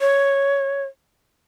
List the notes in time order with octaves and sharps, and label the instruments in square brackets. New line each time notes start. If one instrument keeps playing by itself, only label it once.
[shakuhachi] C#5